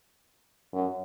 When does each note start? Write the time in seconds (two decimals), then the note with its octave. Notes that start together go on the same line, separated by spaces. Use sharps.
0.73 F#2